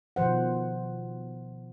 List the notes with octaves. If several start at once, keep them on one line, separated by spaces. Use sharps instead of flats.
B2 D#3 F3 C5 F#5